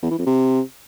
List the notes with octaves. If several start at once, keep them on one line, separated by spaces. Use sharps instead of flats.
E2
E3
F2
C3